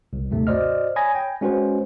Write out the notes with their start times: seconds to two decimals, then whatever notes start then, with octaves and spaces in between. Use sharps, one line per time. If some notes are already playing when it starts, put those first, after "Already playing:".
0.13 C2
0.30 A#1 D#2 G#2 C3 A3
0.47 F#4 C5 D5 D#5 F6
0.96 C#5 G#5 B5 D#6 G#6 A#6
1.15 G5
1.41 G#3 C#4 F#4 B4 C5